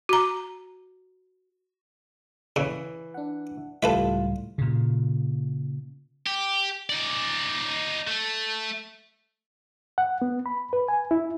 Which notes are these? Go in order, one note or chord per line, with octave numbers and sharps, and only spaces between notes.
F#4 A#5
C#3 E3
D4 F#5
C#2 A2 G3 F4 A4 B4 E5
A#2 C#3
G4
D#4 D5
A3
F#5
B3
B5
B4
G#5
E4